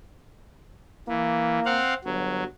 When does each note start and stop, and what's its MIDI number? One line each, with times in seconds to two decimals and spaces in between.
1.08 1.59 52
1.08 1.80 58
1.66 1.94 60
1.66 1.94 77
1.66 1.94 78
2.04 2.44 31
2.04 2.43 54